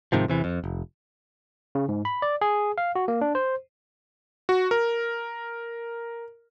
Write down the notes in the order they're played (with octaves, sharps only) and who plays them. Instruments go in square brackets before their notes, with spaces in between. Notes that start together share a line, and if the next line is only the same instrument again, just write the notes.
[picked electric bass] G#2 C3 D#3 F3
E2 C3 E3
F2
F1
[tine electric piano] C#3
G#2
B5
D5
G#4
F5
F#4
A#3
D4
C5
[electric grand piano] F#4
A#4